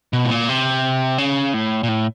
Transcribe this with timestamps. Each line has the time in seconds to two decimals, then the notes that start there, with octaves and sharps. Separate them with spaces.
0.13 B2
0.25 A2
0.31 A#2
0.49 C3
1.18 C#3
1.54 A2
1.83 A#2
1.88 A2